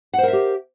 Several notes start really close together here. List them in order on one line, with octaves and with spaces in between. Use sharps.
F#5 C5 A#4 E5 G4